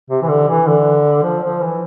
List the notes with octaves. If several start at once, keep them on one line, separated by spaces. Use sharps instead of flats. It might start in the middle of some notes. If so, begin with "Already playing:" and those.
C3
E3
D3
E3
D3
F3
F3
E3